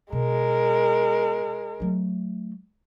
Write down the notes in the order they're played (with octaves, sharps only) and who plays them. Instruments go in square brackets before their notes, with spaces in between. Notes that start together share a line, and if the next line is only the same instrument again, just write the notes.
[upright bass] B2 [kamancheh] G#3 A#4
[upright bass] F#3 A3